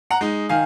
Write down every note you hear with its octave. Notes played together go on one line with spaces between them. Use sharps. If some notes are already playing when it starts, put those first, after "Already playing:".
F#5 A#5
G#3 D#4
D#3 F5 G#5